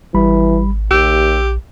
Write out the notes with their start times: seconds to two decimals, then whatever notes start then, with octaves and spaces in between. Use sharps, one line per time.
0.14 G#1 E3 G3 B5
0.91 A#1 D#2 G4 E6